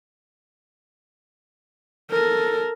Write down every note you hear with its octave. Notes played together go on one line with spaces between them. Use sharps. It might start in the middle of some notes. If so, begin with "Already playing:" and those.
A4 A#4